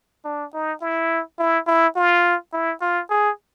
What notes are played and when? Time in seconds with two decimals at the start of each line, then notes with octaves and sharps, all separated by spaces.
0.25 D4
0.53 D#4
0.81 E4
1.39 E4
1.67 E4
1.96 F4
2.53 E4
2.81 F4
3.10 G#4